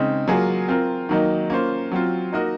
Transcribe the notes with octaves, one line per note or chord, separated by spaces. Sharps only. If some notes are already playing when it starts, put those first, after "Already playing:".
Already playing: C#3 G#3 C4 D#4
F#3 A#3 F4 G#4
C4 F4 A#4
D#3 F#3 A#3 D#4
A#3 C#4 F4 C5
F#3 C4 F4
A#3 D#4 F#4 A#4 D#5